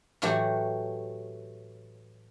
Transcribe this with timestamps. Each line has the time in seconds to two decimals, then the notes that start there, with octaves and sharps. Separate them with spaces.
0.22 A2 E3 F#3 A3 F#4 G4